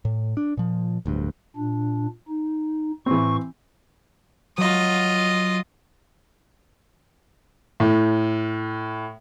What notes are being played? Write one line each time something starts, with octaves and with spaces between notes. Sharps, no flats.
A2
D4
A#2 F3
D1 D2 G2
A#2 D4
D#4
A2 E3 C4 C#6
F#3 F4 D#5
A2